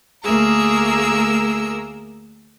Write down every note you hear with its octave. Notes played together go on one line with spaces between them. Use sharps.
D2 A3 A#3 G#4 A#4 E6